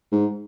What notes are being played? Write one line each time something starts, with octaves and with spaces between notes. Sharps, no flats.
G#2